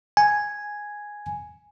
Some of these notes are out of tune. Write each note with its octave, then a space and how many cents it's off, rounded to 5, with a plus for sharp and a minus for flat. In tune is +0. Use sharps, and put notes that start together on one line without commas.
G#5 +0